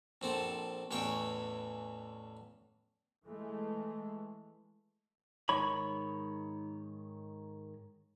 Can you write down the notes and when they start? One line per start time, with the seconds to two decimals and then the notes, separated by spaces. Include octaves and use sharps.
0.21 A#1 C4 A4
0.91 A1 E2 E3 C#5 G5
3.25 E3 G#3 A3
5.49 G#2 D#3 C#5 B5